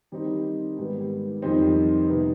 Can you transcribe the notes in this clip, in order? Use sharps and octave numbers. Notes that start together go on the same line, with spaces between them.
D#3 G3 C4 D#4
G#2 D#3 G3 B3
F2 D#3 G3 C4 D#4
C3 G3 B3 D#4